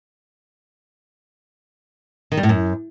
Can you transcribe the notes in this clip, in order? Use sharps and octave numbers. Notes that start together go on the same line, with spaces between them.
D#3
G3
A2
F#2